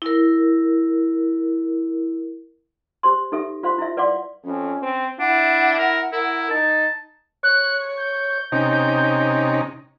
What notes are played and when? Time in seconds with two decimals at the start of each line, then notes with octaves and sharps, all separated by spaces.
0.02 E4 A#4
3.03 G4 C5 C6
3.32 D#4 G4 A4 E5
3.63 F4 C5 F5 C6
3.78 E4 E5
3.97 B4 D5 F5 F#5 C6 D6
4.44 F2 C#4
4.82 C4
5.19 D4 E4 F#5
5.78 A#4
6.13 E4 A#4
6.50 D#4 A5
7.43 C#5 F#6
7.97 G6
8.52 C3 C#4 D#4